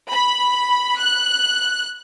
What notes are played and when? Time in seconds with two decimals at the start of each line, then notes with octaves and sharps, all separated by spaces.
0.11 B5
0.99 F#6